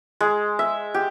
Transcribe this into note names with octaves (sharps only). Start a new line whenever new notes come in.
G#3
E5
G4